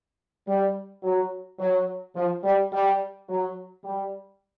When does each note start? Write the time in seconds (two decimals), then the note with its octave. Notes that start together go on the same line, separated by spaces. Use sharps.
0.47 G3
1.03 F#3
1.60 F#3
2.16 F3
2.44 G3
2.72 G3
3.29 F#3
3.84 G3